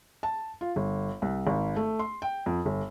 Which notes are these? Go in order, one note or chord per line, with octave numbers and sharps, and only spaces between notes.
A5
F4
G1
C2
G#1
A3
C6
G5
F2
G1